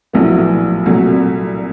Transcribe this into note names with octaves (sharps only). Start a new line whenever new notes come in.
A#1 A2 F#3 B3 E4
C2 A#2 F#3 A3